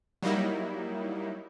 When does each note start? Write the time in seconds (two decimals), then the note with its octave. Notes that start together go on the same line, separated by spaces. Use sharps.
0.22 F#3 G3 A#3 D#4 E4